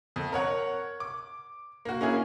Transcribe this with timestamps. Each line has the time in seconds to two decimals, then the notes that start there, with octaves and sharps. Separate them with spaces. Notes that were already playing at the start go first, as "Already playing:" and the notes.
0.16 F2
0.32 A#4 C#5 F#5
1.00 D6
1.85 A#3 F#4
2.01 A#3 C#4 E4 G#4